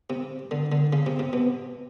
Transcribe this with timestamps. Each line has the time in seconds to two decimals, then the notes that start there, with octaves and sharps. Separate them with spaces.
0.10 C3
0.51 D3
0.72 D3
0.93 C#3
1.06 C3
1.19 C3
1.33 B2